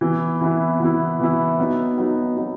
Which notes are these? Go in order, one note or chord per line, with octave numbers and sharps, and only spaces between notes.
E3 B3 E4
E3 B3 E4
E3 B3 E4
E3 B3 E4
F#3 B3 D#4
F#3 B3 D#4
F#3 B3 D#4